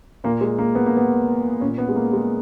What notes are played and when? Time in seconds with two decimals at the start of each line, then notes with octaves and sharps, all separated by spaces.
0.24 A#2 A#3
0.41 G#3
0.58 A#3
0.75 B3
0.86 A#3
0.97 B3
1.61 A#2 C#4
1.78 B3
1.89 G#3
1.96 A#3
2.13 G#3